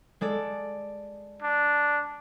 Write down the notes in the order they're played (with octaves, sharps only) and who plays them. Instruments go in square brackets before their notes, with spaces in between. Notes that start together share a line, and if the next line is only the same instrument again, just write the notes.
[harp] G#3 A4 D5
[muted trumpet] D4